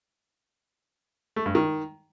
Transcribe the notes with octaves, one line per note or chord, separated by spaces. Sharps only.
A3
G2
D#3